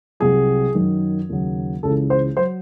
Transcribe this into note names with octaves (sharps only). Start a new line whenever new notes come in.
C2 C3 F#3 G#4
F#2 D#3 F#3
D#2 C#3 F#3
C#2 C#3 E3 A4
C5
F#3 C5